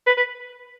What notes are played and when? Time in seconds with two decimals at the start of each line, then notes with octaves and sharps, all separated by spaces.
0.07 B4
0.17 B4